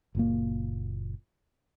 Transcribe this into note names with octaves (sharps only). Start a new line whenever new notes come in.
F#1 A#2 A#3